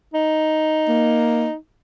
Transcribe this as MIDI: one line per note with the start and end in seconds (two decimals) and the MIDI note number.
0.14 1.55 63
0.88 1.47 58